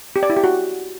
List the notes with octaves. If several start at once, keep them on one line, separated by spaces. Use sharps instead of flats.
G4
D5
E4
G4
F#4